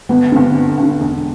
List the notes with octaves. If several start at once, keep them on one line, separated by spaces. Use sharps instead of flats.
G1 B3
G2 D3 C4
G1
G2 D3
E1